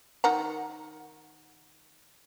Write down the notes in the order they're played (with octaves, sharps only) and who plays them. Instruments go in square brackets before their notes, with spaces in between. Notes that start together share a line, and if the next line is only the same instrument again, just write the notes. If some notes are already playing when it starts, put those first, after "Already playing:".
[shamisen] D#3 F#5 A#5